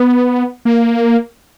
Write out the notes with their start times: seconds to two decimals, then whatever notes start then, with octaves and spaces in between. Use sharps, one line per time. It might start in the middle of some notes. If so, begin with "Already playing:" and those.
Already playing: B3
0.65 A#3